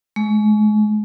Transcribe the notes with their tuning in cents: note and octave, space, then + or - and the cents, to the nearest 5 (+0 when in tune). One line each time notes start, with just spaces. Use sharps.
G#3 +35